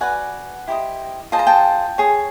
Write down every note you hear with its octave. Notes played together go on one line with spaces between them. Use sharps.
F#4 B4 D5 F#5 G#5
E4 G4 C5 D#5
F4 G#4 C5 D#5 A5
A#5
G5 A5
G#4 C#5